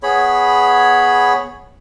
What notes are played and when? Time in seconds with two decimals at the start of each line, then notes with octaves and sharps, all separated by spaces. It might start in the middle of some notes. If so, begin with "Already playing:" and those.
0.03 B3 G#4 C#5 B5